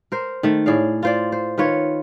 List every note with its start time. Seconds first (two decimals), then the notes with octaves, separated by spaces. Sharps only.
0.12 A#4 C5
0.43 D#3 A3
0.66 A2 G#4 D5 F5
1.03 F4 C5 D5
1.32 C5
1.58 D#3 F4 B4 C#5